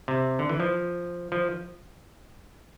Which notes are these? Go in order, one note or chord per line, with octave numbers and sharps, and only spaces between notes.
C3
D3
E3
F3
F3